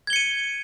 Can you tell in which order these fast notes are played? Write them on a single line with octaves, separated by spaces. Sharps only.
G#6 G7 C#7 D#7